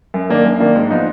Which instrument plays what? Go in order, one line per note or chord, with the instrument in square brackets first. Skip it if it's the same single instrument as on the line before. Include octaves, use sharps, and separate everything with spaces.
[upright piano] F#2
D#3 A#3 D4
F#2
D#3 A#3 D4
G#2
F3 B3 D#4